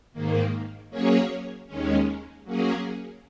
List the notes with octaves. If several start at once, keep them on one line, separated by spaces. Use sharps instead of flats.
G#2 D#3 A#3
F#3 A#3 C#4 G#4 C#5
D#2 D#3 G#3 C#4
F#3 A#3 C#4 G#4